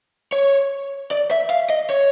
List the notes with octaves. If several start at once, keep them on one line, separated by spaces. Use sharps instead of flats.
C#5
D5
E5
F5
D#5
C#5